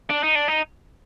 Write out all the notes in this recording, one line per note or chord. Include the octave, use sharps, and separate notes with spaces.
D4
D#4
D4
D#4